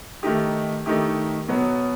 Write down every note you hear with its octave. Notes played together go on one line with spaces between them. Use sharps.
D#3 A3 D#4 G4
D#3 A3 D#4 G4
B2 F#3 B3